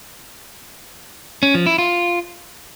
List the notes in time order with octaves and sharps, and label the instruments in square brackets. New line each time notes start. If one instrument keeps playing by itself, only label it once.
[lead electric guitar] C#4
F3
E4
F4